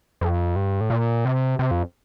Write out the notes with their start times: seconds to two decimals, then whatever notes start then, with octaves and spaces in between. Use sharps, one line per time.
0.21 F2
0.56 G2
0.81 A2
0.90 A#2
1.25 C3
1.59 C3
1.71 F2